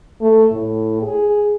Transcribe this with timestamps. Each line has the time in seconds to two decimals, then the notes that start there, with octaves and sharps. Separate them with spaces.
0.21 A3
0.51 A2
1.03 G#4